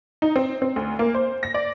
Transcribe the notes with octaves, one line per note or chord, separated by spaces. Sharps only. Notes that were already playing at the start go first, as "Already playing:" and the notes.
D#4
C4
C4
D2
A#3
C5
A#6
D5